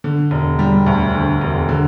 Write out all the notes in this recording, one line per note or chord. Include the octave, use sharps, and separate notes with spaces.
D3
E1
G3
D2
D3
E1
D3